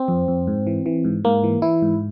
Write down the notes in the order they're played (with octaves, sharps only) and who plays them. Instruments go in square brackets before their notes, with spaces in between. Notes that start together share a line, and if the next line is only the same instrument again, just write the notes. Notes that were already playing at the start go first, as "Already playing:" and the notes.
Already playing: [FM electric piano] C4
F2
F2
G#2
E3
E3
G#2
G#2 A#3
E3
E3 E4
G#2